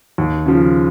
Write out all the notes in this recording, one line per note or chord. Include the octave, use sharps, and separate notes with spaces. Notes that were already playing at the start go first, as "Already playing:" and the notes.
D#2
C#3 F3